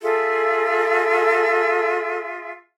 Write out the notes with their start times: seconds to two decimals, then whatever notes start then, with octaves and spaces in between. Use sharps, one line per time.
0.02 F4 G#4 A4 E5